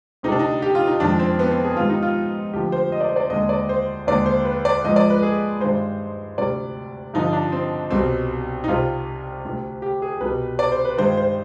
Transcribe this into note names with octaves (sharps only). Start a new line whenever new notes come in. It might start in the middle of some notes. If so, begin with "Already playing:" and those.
D2 C3 G3 D#4
D4
D#4
G4
F4
D#4
F2 D#3 G#3 D4
C4
B3
C4
G#4
G#2 D#3 G3 F4
D#4
F4
D2 D3 F3 G4
C5
D#5
D5
C5
D5
D#2 D3 G#3 D#5
D5
C5
D#2 D3 G#3 D5
C5
B4
D5
G#2 F3 G#3 D#5
D5
B4
G#4
G2 D#3 G#3 C5
D2 C3 G3 D5
G2 D3 F3 D#4
D4
C4
C2 B2 G3 C4
D#4
C2 C3 G3 F4
D2 C3 G3
G4
G#4
C2 B2 G3 B4
D5
C5
B4
G2 D#3 G#3 C5
C5